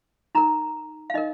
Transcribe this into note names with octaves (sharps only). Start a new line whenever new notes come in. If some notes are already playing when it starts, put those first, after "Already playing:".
D#4 A#4 A#5
F5
D#4 A#4 D#5